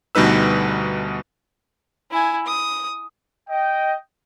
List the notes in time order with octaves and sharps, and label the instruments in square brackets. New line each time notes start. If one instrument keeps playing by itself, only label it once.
[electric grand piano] D2 B2 G3 D#4 B4 E6
[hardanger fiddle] E4 G#5
D#6
[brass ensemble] D#5 G5